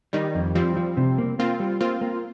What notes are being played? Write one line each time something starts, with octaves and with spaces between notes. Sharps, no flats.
D#3 G3 D#4
F2
F3 G3 C4
F3
C3
A#3
A#3 C4 F4
G3
A#3 C4 F4
A#3